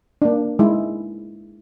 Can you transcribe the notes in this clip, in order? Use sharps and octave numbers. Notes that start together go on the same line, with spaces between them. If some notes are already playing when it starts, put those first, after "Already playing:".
A#3 D4
G#3 E4